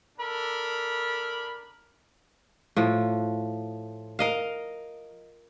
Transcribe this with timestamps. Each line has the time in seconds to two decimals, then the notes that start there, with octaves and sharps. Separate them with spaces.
0.19 D4 A4 A#4 B5
2.76 A2 F3
4.19 A#4 D#5 F5